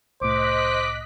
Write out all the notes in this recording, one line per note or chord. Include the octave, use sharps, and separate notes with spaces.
C2 A2 C5 D#5 D6 F#6 B6